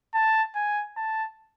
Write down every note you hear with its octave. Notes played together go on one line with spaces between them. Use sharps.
A5
G#5
A5